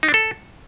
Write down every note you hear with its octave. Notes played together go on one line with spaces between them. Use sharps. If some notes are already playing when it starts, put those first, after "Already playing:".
D#4
D4
A4